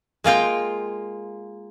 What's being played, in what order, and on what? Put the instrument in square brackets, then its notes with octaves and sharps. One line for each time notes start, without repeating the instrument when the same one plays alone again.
[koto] G#3 A#3 F4 G5